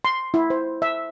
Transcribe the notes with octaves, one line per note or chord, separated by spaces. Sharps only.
C6
E4
C5
E5